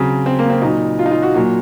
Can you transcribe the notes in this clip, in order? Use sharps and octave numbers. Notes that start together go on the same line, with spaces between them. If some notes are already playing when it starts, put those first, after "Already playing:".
Already playing: C#3 F#3 C4
C4
A#3
C4
A#2 F#3 D#4
F4
D#4
F4
F#4
A#2 F#3 F#4